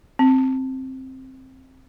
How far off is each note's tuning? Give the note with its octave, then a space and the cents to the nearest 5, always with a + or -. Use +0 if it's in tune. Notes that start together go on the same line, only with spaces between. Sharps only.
C4 +10